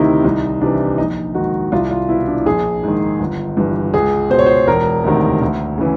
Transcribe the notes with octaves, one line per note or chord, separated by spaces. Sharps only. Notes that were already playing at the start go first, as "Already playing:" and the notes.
Already playing: D2 C3 D#3 D#4 E4
C2 D#4
C3 E3 D4
A#1 D#4
G#2 D#3 F#4
C2 F4
F4
B2 E4
D4
A#1 G#4
G#2 D#3
G1
G2 E3
C#2 G#4
B2 C5
C#5
C5
E1 A#4
D2 C3 D#3
D2
C#3 E3